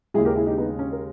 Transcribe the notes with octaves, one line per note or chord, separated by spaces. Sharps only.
D#2 C#3 G#3 E4 G#4
G4 A#4
E4 G#4
D#4 G4
B3 D#4
C#4
A#4